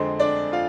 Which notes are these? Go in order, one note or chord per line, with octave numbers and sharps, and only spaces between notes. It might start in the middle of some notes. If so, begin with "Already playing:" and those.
Already playing: F2 D3 G#3 C4 C5
D4 D5
F4 F5